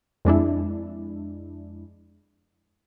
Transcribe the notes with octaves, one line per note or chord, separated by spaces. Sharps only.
F2 G#3 D4 E4